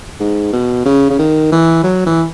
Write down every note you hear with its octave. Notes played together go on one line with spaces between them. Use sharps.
G#2
B2
C#3
C#3
D#3
E3
F#3
E3